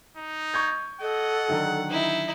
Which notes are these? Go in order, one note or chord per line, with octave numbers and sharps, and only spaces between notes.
D#4
C#6 G6 G#6
A4 D#5 F#5
D3 D#3 F#3
D#4 E4